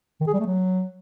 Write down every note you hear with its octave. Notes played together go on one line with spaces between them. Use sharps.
D#3
G#4
G3
A3
F#3